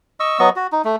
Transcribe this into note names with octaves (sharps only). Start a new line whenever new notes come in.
D#5 C#6 E6
F#3 B3 D#5 C#6
F#4
D#4
A3